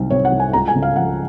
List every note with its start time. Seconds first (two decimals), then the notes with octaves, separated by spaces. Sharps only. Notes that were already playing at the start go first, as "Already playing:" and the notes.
Already playing: C2 C3 D#3 F#3
0.10 C3 C#5
0.25 F#5
0.32 C2
0.40 G#5
0.53 C#2 A#5
0.68 G#5
0.75 C#3
0.82 F5
0.96 F3 F#5